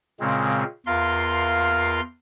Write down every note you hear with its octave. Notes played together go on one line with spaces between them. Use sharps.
A#2 C#3 G#3 C4
E2 F4 A#4 F5 C6